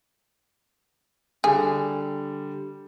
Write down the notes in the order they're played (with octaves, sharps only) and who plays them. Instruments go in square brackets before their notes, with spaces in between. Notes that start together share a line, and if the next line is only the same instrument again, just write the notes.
[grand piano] D3 G3 [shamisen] G#4